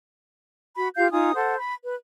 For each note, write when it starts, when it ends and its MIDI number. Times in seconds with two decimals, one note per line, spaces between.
0.76 0.89 66
0.76 0.89 83
0.97 1.11 65
0.97 1.11 67
0.97 1.11 77
0.97 1.11 91
1.12 1.34 63
1.12 1.34 65
1.12 1.34 80
1.12 1.34 87
1.34 1.56 69
1.34 1.56 72
1.34 1.56 78
1.58 1.74 83
1.82 1.95 71